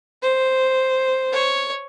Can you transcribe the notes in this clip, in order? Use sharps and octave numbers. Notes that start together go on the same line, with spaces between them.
C5
C#5